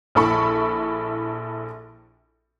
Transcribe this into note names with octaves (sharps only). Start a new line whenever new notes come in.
A#1 E4 A4 B5 C#6